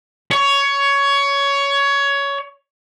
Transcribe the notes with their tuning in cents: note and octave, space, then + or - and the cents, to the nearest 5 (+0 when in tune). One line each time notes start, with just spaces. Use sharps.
C#5 +15